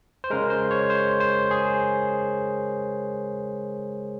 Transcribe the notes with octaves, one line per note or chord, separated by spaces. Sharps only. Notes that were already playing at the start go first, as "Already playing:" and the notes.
C5
C#3 G#3 A#4
C5
C#5
C5
C5
G#4